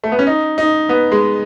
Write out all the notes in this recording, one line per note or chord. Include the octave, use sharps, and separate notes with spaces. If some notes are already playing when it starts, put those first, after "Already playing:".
A3
B3
C#4
D#4
D#4
B3
G#3